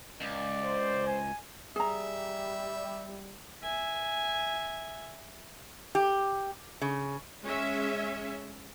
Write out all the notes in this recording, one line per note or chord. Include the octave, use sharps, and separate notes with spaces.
C#2 D5
C5
G#5
G3 G#4 E5 A#5
E5 G#5
G4
C#3
G#3 C#4 E5